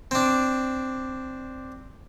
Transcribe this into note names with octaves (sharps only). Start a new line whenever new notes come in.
C4 D4